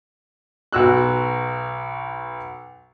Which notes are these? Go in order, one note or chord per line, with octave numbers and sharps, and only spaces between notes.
B1 F#4 E6 F#6